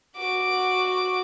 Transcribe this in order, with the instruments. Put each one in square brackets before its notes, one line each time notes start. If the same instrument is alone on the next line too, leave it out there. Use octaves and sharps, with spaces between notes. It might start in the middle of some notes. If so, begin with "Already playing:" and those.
[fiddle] F#4 D6